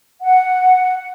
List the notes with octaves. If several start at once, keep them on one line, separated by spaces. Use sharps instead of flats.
F#5